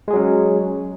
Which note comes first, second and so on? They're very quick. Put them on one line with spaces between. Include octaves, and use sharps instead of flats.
G#3 G#4 F#3 C#4